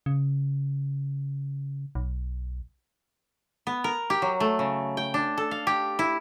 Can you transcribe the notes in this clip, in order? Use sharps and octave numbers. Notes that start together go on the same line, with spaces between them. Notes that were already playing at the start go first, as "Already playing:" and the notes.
C#3
B1
B3
A#4
G4
F#3
A3
C#3
G5
D4
A4
F5
G4
E4